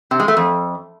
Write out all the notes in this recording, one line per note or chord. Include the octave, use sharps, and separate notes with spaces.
C3
G#3
A3
F2